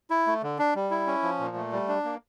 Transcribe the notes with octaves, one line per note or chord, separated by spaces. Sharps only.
E4
A3
D3
D4
G3
E4
C#4
F3
A#2
A3
G3
D4
A#3